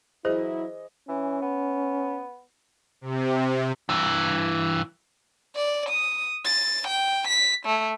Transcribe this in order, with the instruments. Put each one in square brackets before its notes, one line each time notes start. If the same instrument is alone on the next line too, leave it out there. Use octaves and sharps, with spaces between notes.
[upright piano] E3 D#5 [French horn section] F#3 E4 [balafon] G#4 [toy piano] C5
[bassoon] E3 [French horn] C#4
[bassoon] B3
[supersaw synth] C3
[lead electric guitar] G2 E3
[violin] D5
D#6
A6
G5
B6
A3